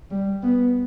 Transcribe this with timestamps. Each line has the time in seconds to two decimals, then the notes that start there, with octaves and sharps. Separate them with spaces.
0.11 G3
0.43 B3